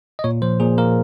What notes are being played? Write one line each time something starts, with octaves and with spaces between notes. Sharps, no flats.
D#5
A#2 C#5
F3 C5
A#2 G#4
A#3 A#4